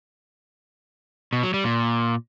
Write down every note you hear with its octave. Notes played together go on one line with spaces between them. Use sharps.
B2
F#3
G3
A#2